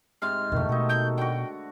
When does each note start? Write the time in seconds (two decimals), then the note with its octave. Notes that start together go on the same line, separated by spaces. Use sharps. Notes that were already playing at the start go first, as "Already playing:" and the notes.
0.22 G#2 C3 C6 F6
0.52 F2 B2 D3 D#3 A3
0.69 B2 D#4 F#4 A4
0.89 G6
1.17 D3 F#4 G5